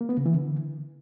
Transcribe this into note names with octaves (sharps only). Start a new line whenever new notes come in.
A#3
B3
C#3
E3
D3